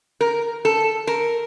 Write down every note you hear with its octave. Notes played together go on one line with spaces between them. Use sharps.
A#4
A4
A#4